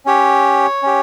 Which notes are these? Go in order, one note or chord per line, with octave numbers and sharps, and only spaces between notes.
C#4 G4 C#5
C#4 G4